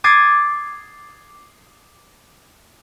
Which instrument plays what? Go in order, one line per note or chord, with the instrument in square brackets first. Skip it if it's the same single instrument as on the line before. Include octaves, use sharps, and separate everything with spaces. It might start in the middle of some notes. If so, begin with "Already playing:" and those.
[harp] D6 D#6 G#6 A6 C7